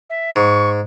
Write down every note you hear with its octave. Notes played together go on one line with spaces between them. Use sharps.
E5
G#2 C#6